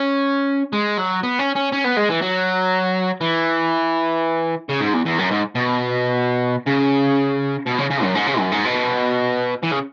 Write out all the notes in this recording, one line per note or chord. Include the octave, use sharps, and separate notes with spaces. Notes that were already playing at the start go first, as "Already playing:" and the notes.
Already playing: C#4
G#3
F#3
B3
C#4
C#4
C#4
B3
G#3
E3
F#3
E3
C#3
G#2
E2
E2
F#2
G#2
B2
C#3
B2
C#3
C#3
F#2
G#2
C#3
F#2
G#2
B2
E3
C#3